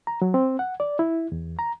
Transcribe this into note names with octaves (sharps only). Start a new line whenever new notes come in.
A#5
F#3
C4
F#5
D5
E4
E2
A#5